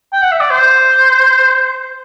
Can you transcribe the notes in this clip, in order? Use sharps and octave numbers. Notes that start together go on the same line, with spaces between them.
G5
F#5
E5
D5
C5